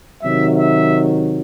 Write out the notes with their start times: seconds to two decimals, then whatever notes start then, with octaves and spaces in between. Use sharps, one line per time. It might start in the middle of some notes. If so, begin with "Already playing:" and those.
0.22 C3 D#3 F#3 E5
0.55 E5